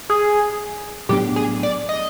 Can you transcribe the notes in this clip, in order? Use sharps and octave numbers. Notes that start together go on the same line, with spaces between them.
G#4
A2 F#3 B3 D4 G4
G#4
D5
D#5